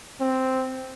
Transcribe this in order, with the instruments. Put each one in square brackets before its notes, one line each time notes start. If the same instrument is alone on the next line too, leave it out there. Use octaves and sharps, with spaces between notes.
[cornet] C4